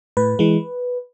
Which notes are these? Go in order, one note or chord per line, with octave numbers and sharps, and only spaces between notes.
A2 B4
E3 G#3